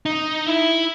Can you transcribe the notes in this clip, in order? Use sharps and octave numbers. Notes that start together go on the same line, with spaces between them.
D#4
E4